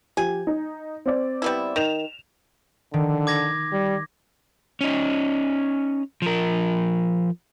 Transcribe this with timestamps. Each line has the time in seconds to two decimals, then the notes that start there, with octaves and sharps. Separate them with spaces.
0.17 F3 G4 G#5
0.47 D#4
1.06 C4 D5
1.42 G3 B3 E4
1.76 D#3 E7 F7
2.94 D3 D#3
3.27 D6 G#6 A#6
3.72 G3
4.81 C#4 D#4
6.22 F3 A#4